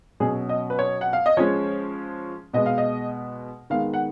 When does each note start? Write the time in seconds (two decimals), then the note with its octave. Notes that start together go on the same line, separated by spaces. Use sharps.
0.20 B2 F#3 C#4 G#4
0.49 D#5
0.70 B4
0.79 C#5
1.01 F#5
1.13 F5
1.26 D#5
1.37 F3 G#3 C#4 C#5
2.53 B2 G#3 B3 D#5
2.66 F5
2.78 D#5
3.70 D#3 G#3 B3 F5
3.94 F#5